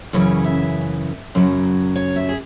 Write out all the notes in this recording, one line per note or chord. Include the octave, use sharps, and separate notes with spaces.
F#2 C#3 E3 C#4
E5
F#2 C#3 F#3
C#5
E5
G#4